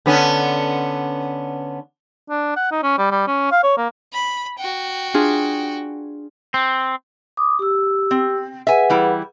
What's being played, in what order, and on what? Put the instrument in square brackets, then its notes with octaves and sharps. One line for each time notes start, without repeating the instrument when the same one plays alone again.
[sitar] D3 B3 C#4
[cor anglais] D4
F#5
D#4
C#4
G3
G3
C#4
F5
C#5
A#3
[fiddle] B5
F#4 G5
[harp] D4 F4 G#4
[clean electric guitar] C4
[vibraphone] D6 D#6
G4 E6
[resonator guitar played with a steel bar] C4
[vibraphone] G#4 B4 F#5 [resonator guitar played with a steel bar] E5 G#5
[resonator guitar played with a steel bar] E3 G3 E4